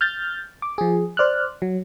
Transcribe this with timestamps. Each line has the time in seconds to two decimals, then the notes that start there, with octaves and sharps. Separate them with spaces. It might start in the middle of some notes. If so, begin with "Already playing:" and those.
0.01 F6 G6 A6
0.62 D6
0.78 F3 G#4
1.17 C5 D5 F6 F#6
1.62 F#3